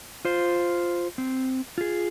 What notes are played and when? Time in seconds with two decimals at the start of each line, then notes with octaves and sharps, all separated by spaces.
0.25 F4 C5
1.18 C4
1.78 F4 G#4